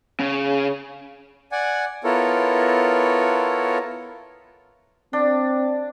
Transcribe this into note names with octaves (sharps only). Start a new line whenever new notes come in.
C#3
D5 F#5 G#5
B3 E4 F4 A4 A#4 C#5
C4 D4